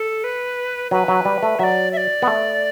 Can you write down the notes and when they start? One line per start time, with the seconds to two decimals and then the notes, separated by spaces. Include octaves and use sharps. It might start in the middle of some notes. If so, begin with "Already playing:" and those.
Already playing: A4
0.24 B4
0.91 F#3 B4
1.08 F#3
1.25 G3
1.43 A3
1.59 F#3 D5 E5
1.92 E5
1.97 D5
2.22 B3
2.27 A3